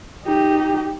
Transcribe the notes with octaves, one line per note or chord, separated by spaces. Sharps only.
D#4 G4